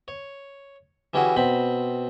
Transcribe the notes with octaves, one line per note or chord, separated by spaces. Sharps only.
C#5
E3 G3 C#4 E4 F#4 G#4
B2 C4 B5